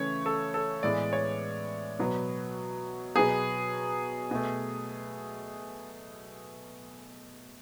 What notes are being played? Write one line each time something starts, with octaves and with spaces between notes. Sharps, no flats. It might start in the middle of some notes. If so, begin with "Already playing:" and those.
Already playing: C#3 E3 A3 C#5
A4
A4
A2 E3 G#3 B3 D5
C#5
B2 F#3 B3
B2 F#3 B3 G#4
B2 A3